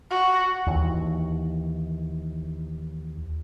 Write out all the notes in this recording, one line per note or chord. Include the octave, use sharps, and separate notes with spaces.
F#4
D#2 E3